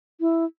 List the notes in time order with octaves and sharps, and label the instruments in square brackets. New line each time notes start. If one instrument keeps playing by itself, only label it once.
[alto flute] E4